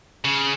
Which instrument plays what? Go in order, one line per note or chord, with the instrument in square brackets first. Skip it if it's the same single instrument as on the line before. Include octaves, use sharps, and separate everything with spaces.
[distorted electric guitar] C#3